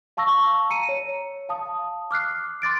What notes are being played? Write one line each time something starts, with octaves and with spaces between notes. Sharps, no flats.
F5 A5 C#6 E6 A#6
A#5 C#7 D#7
C#5
F5 A5 D#6
D6 F6 F#6 C7
C6 D6 A6 D7